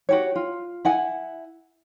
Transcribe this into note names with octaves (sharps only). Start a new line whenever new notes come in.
F#4 G4 C#5
F4
E4 F#5 G#5